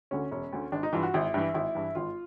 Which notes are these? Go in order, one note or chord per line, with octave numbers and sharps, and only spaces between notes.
D2 D3 C#4
E1 C#4
D2 D3
G#1 D4
D#4
G2 E3 F4
F#4
G#1 E4
G2 E3
G#1 E4
G2 E3
G#1 F4